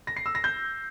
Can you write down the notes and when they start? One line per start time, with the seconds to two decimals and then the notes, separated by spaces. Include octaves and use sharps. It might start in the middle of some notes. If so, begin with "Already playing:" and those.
0.07 A#6
0.16 C7
0.26 E6
0.35 A#6
0.44 G6